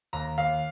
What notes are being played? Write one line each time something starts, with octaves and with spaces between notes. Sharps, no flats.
D#2 A#5
D#2 F5